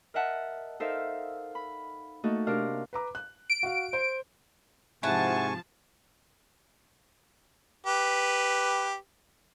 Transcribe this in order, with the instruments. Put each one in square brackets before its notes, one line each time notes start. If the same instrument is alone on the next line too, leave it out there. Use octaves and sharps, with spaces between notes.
[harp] A#4 D#5 E5 F#5 A5
D#4 A4 A#4 C5 E5 F5
B5
A3 A#3 D#4 F#4 A4
C3 D4 A#4 F5
[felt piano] B4 A#5 D6
F#6
[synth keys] D7
[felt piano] F#4 F5
C5
[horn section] G#2 C3 [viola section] F3 A5 [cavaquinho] E4 F#5 [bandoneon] G#5 C#6
[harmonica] G4 B4